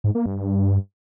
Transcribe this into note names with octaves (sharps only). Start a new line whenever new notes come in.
G#2
A#3
G2